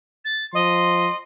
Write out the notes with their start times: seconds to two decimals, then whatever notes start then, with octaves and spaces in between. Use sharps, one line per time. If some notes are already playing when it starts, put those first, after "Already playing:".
0.25 A6
0.54 F3 D#5 C6